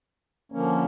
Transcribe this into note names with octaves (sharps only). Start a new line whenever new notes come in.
D3 F3 A#3 C#4